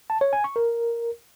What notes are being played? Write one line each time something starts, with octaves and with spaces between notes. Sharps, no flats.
A5
C#5
G#5
C#6
A#4